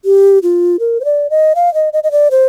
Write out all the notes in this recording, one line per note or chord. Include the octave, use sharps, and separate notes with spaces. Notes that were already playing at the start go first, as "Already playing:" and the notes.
G4
F4
A#4
C5
D5
D#5
F5
D#5
D#5
D#5
D5
C5